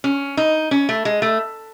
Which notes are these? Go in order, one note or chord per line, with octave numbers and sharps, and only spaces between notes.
C#4
D#4
C#4
A3
G#3
A3